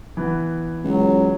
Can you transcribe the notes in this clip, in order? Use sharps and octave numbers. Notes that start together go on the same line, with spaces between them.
E3 B3
C#2 F#3